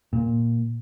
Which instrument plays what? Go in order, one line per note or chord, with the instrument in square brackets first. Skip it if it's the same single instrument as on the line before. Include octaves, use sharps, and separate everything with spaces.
[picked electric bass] A#2